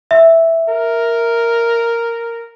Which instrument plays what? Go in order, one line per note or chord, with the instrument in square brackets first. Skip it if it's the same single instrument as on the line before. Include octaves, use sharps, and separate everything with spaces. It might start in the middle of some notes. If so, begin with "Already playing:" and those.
[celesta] E5
[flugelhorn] A#4